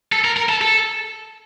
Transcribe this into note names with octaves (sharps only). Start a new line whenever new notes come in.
A4
A#4
A#4
A4
A4